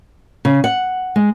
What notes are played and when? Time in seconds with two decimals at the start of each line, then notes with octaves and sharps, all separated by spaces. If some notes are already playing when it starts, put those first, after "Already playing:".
0.45 C#3
0.64 F#5
1.16 G#3